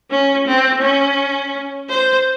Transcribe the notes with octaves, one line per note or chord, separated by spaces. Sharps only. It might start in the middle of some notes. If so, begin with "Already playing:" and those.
C#4
C4
C#4
C5